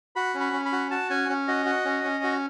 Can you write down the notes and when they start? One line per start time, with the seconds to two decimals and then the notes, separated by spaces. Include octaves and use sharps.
0.16 F#4 B5
0.34 C#4
0.40 B5
0.53 C#4
0.65 B5
0.72 F#4
0.91 F#4 A5
1.10 C#4 G#5
1.29 C#4
1.48 F#4 D#5
1.66 F#4
1.85 C#4
2.04 C#4
2.24 F#4